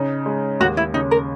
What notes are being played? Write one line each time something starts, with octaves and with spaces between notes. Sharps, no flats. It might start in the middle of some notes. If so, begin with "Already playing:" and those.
Already playing: C#3 D#4
G#3
D#2 F#4
E4
C#3 D#4
A#4